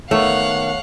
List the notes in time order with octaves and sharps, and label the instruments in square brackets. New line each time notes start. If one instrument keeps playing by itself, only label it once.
[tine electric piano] D#3 B3 A#4 [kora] A3 [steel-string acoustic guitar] C#5 [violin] F5 F#5